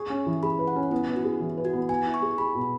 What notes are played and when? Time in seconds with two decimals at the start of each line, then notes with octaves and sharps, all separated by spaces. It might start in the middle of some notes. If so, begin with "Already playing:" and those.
Already playing: G#4 C#6
0.10 C#4
0.26 E3
0.43 G#4 B5
0.59 B4
0.67 F#5
0.76 C#4
0.91 B3 E4
1.08 B3
1.16 F#4
1.24 G#4
1.40 E3
1.57 B4
1.65 F#4
1.73 B3
1.89 B3 G#5
2.06 E4
2.14 C#6
2.22 G#4
2.38 G#4 B5
2.55 B2